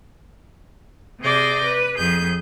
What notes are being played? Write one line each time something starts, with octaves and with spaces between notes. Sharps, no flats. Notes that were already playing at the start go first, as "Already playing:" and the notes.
C3 G#4 D5 G6 A#6
B4
F2 G#4 G6